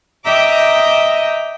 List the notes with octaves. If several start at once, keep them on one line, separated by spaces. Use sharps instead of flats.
D#5 E5 G5 A#5 D6